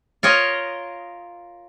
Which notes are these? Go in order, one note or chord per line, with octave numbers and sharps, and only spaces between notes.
F4 A#4 C#5 D#5